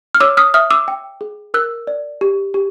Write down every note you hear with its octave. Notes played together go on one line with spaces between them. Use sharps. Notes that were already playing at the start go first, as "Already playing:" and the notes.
F6
C#5 D6 E6
D#6 F6
E5 D#6 F6
D6 E6
G5
G#4
A#4 E6 F#6
D5
G4
G4